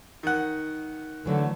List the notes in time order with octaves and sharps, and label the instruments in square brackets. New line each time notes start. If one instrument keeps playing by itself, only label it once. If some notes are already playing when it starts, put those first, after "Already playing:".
[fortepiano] D#3 F#5
[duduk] D3 [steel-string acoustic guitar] E3 F#3 A3